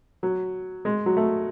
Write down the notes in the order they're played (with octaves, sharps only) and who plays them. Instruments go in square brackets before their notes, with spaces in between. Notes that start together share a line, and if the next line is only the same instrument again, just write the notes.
[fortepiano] F#3
G#3
F#3
A3